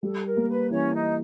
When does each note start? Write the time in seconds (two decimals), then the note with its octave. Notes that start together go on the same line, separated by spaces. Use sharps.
0.03 G3 A4
0.26 A#4
0.37 A#3
0.48 B4
0.70 E3 C#4 C#5
0.93 D#4 D#5